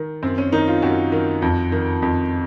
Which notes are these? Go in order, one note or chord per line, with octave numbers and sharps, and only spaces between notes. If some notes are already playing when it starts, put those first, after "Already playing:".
Already playing: D#3
F#2 C4
C#4
D#3 D#4
F4
F#2 F#4
D#3
F2
D#3
F2